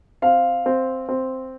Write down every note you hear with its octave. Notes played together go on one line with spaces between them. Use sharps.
C4 F5
C4
C4